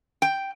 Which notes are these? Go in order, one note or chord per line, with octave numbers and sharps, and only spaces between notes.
G5